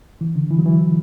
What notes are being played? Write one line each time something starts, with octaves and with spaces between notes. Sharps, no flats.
E3
D3
E3
F#3
E3